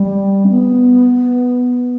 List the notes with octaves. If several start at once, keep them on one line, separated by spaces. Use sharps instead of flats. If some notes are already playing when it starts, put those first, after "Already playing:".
Already playing: G3
C#4
B3